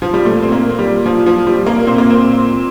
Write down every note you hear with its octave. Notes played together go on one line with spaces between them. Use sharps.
F3
G3
A#2 A3
C4
A#3
G3
F3
F3
G3
A#3
A#2 C4
A#3
C4